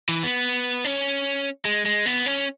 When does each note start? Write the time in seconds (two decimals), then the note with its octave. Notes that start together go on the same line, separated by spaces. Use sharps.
0.09 E3
0.23 B3
0.85 C#4
1.65 G#3
1.85 G#3
2.06 B3
2.26 C#4